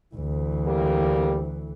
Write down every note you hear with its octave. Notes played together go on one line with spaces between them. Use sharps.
D2 E3
G3 A#3 G4